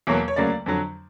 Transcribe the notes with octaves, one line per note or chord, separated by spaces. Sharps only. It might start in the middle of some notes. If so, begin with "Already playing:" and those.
E2 B2 F#3 A#3 C#5
C#5
D2 C#3 F#3 A#3 D5
F2 D3 F#3